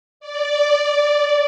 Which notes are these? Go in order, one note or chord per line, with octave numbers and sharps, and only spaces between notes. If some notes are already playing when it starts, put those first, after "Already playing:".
D5